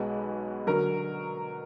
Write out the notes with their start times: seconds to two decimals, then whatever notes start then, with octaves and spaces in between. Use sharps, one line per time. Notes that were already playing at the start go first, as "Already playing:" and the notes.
Already playing: B1 B2 G#3 B4
0.67 D3 F#3 A#4